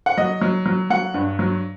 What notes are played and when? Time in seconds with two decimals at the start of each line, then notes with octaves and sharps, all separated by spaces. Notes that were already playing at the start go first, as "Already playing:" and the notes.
0.06 F#5
0.17 F#3 D#5
0.41 F#3
0.66 F#3
0.90 F#3 F#5
1.14 G2
1.39 F#3